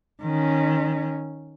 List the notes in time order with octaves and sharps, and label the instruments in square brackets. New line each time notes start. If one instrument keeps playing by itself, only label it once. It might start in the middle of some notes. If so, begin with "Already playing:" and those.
[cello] D#3 C#4